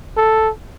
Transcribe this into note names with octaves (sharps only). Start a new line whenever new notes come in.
A4